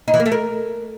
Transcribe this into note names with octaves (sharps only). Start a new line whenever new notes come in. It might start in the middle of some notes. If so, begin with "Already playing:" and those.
D#4
E3
A#3
A3
A#4